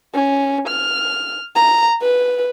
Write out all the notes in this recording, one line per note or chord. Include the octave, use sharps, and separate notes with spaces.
C#4
F6
A#5
B4